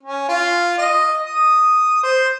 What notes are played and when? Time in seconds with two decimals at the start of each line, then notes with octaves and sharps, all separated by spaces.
0.03 C#4
0.28 F4
0.78 D#5
1.26 D#6
2.03 C5